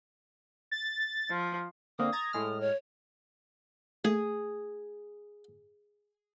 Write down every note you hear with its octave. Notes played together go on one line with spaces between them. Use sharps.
A6
F3
D3 A#3 C4 D#6
A#5 G#6 A6
A2 G#3 F6
C#5
A3 G#4